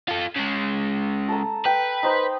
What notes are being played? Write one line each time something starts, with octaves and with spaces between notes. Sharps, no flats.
F4 A4
C#3 G#3
A4 A#5
B4 G5
D#4 C5 B5